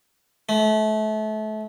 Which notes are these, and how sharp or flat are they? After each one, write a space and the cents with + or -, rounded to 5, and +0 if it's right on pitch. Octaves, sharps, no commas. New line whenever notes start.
A3 -30